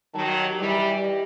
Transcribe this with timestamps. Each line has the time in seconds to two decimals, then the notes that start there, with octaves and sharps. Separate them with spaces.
0.14 D#3 F#3 A5
0.28 D#5
0.44 G4
0.59 E3 G3 G4
0.75 G4
0.89 G4
1.04 D#5